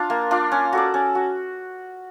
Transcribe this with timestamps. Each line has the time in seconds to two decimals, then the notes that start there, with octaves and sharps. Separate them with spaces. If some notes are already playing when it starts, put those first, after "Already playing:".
Already playing: D4 F4
0.10 A#3
0.31 D4 F4
0.52 C#4
0.73 F#4 A4 D5
0.94 C#4
1.15 F#4